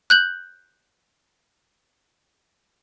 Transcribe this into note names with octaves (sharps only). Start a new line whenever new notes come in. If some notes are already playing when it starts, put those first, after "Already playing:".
F#6 G6 F#7